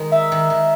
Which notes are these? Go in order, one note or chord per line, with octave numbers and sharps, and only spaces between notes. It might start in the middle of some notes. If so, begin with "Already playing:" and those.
Already playing: D#3 G#3
D#4 E5
D#3
D#3